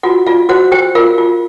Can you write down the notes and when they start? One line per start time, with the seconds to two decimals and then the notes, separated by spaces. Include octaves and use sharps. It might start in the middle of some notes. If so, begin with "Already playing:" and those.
0.03 F4 F#4 F#5
0.27 F4 F5
0.49 F#4 C5 F#5
0.72 G4 C5 G5
0.95 F4 A#4 F5
1.18 F4